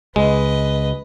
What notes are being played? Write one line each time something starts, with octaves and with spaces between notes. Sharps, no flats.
C#2 G#3 B4 D#5